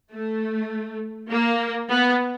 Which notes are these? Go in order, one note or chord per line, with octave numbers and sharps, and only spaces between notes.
A3
A#3
B3